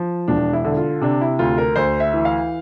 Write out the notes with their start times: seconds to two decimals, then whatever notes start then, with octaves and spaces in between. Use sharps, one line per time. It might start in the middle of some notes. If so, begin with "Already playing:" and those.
Already playing: F3
0.28 E1 D4
0.53 E4
0.64 D3
0.77 F4
1.01 C3 D4
1.21 E4
1.39 D2 F4
1.58 A#4
1.76 D2 C5
2.00 E5
2.14 E3
2.25 F5